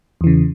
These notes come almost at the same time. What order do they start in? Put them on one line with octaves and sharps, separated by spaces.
E2 E3 C#3